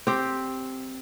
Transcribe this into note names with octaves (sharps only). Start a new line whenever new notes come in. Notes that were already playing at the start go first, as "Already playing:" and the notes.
C4 G4